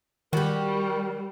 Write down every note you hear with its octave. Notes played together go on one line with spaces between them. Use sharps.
D#3 G3 F#4 G4 A#4